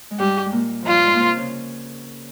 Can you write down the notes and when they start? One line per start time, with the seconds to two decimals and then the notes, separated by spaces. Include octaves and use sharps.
0.11 G#3
0.19 G2 G3 G4
0.46 G#3
0.52 A#2 A#3
0.83 G2 F3 G3 F4
1.04 G#2 G#3
1.14 A#3
1.20 C3 C4
1.37 C#3 C#4